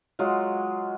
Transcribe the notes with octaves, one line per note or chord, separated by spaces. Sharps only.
F#3 G#3 F4